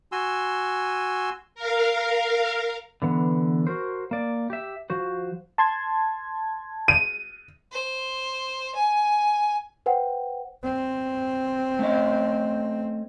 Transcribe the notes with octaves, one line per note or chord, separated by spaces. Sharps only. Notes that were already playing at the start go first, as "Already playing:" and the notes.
F#4 G#5 C6 E6
A#4 F5
D3 E3 B3
F#4 A#4 C5
A#3 D5
G4 E5
F3 F#4 C5
A5 C6 G#6
D#7
C5
G#5
B4 C5 F#5 G5
C4
A3 C#4 D#5